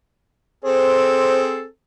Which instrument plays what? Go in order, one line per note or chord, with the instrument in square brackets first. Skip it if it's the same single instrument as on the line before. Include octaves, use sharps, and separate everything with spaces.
[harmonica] C4 G#4 A4 [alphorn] C5